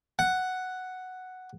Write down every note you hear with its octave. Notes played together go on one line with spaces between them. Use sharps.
F#5